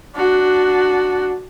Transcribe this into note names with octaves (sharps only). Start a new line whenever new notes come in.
D4 F#4